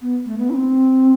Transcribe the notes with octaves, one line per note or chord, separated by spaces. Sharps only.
B3
A3
B3
E4
C4